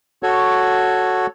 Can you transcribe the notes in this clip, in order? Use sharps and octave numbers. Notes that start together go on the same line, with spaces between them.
F#4 A4 C#5